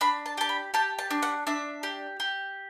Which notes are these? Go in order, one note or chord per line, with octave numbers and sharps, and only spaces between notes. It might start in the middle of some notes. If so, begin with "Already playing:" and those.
D4 B5
A5
G4 A5
B5
G4 A5
A5
D4
F#5
D4 E5
G4
G4